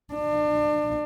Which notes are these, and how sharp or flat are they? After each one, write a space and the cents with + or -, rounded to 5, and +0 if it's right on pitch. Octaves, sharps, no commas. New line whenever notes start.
D4 +30